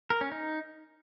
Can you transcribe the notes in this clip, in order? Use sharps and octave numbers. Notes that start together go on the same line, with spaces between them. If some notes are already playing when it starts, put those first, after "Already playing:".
A#4
C#4
D#4